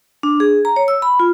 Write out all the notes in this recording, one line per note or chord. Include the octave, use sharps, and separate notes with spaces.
D4
G#4
A#5
C#5
E6
B5
F4